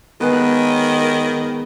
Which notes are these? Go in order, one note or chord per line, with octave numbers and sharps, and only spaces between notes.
D#3 G#3 B3 G#4